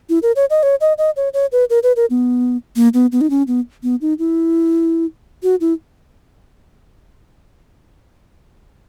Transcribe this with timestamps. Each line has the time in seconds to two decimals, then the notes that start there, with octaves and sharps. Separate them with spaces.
0.10 E4
0.23 A#4
0.36 C#5
0.50 D#5
0.63 C#5
0.81 D#5
0.98 D#5
1.16 C#5
1.34 C#5
1.52 B4
1.70 A#4
1.83 B4
1.96 A#4
2.10 B3
2.76 A#3
2.94 B3
3.12 B3
3.21 D#4
3.30 C#4
3.47 B3
3.83 B3
4.01 D#4
4.19 E4
5.43 F#4
5.61 E4